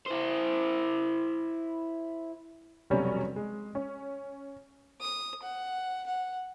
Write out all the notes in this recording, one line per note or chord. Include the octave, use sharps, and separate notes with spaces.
E4 C5
F1 B1 F#3 G3 C#4
G#3
C#4
D#6
F#5
F#5